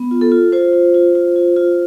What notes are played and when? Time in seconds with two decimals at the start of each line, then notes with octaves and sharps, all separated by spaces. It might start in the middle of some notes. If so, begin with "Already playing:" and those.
Already playing: B3
0.11 F4
0.21 A4
0.32 F4
0.52 F4 C5
0.73 F4
0.94 F4
1.15 F4
1.36 F4
1.56 F4